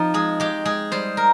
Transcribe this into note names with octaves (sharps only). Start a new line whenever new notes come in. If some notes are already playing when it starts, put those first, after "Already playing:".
Already playing: F3 C4 D#4
G#3 G#4
G#3 G4
G#3 G#4
G3 C5
A#4